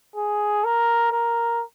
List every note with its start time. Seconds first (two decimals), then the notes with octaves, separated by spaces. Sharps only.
0.16 G#4
0.64 A#4
1.12 A#4